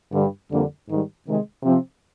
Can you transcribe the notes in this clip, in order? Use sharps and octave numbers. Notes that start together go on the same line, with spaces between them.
G2 D3 G3
F2 D3 G3 A#3 D4
G#2 D#3 G3
C3 D#3 G#3
C3 F3 C4